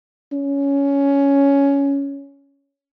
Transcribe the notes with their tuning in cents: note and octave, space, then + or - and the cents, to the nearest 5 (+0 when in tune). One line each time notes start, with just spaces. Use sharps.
C#4 +10